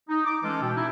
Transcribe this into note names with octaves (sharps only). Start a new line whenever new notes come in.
D#4
D6
E3 G#3 C#4 F4 A4
B2 G5
D#4 E4